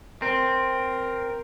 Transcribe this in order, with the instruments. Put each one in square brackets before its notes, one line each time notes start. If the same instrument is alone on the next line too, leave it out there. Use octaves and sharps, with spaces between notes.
[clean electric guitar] C4 [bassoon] A#4